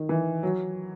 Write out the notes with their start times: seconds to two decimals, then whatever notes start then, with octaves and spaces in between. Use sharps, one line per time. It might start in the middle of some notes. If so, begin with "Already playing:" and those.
Already playing: D#3
0.09 E3
0.43 F#3